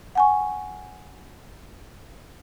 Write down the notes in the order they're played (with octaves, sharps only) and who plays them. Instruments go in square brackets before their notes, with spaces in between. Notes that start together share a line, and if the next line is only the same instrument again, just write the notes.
[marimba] F#5 G#5 C#6